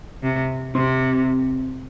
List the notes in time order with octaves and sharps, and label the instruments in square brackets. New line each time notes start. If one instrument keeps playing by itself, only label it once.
[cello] C3
[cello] C3 [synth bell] C4